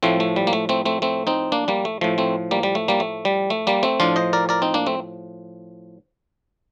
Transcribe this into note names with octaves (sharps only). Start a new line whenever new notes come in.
A2 F3 A3 C4
A3
G3
A#3
A3
A3 C4
A3 C4
A3 C4
C4 D#4
A#3 D4
G3 A#3
A3
A2 F3 A3
A3 C4
G3 A#3
G3
A3
G3 A#3
A3
G3
A3
G3 A#3
A3 C4
A2 F3 D4 F4
C5 D#5
A#4 D5
A#4 D5
C4 D#4
A#3 D4
A3 C4